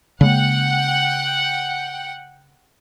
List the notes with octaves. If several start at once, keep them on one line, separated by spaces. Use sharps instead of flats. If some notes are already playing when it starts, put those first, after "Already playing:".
C#3 G#3 A#3 F#5 G5